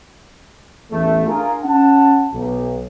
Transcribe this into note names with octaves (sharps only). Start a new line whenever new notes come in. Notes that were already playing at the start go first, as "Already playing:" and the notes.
A1 E2 A3
D4 F4 G#4 A#4
C#4 F#5 A5
B1